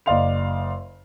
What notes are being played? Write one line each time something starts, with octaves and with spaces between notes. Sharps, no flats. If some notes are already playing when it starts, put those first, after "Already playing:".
F#1 D5 D#5 F5 C6 F7